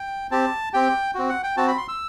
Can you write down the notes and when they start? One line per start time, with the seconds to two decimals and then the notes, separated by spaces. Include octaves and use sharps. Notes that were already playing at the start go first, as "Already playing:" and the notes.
Already playing: G5
0.31 C4 G4 A5
0.74 C4 G4 G5
1.15 C4 F#4
1.29 F#5
1.43 G5
1.57 C4 F#4 A5
1.68 B5
1.77 C6
1.88 E6